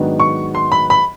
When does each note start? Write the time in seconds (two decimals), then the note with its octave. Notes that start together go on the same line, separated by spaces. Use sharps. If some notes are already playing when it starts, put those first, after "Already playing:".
Already playing: G#2 D#3 F#3 B3 D4
0.20 C#6
0.55 C6
0.72 B5
0.90 B5